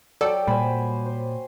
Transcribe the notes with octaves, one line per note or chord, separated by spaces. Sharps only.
F#3 A4 D5 G5
A#2 G3 C5 G#5 B5
C5